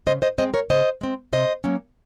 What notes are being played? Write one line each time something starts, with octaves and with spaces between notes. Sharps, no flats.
C#3 C5 D#5
C5 D#5
G#3 C4 C5 D#5
A#4 C#5
C#3 C5 D#5
G#3 C4
C3 C5 D#5
F#3 A#3 C#4